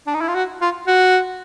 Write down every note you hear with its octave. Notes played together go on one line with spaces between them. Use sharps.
D4
D#4
E4
F4
F#4
F4
F#4